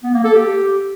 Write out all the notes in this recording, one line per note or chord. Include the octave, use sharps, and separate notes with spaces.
B3
A#3
A4
G4